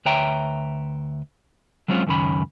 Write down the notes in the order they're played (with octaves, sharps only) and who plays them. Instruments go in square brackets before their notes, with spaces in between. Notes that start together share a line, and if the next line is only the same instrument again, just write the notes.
[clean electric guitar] D2 B4 C#5 E5 G5 A#5
F#3 G#3 C4 C#4 F4
C#2 F#2 D#3 C#4 B5